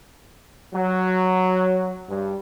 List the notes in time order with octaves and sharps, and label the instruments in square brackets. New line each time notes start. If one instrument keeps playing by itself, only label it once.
[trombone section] F#3
G2